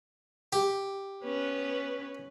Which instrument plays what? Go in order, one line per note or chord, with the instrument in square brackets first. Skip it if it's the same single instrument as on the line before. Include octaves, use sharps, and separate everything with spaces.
[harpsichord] G4
[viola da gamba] B3 C#4 B4